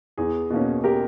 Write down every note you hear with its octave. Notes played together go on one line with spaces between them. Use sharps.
E2 G#4
B2 A#3 C#4
G4 A#4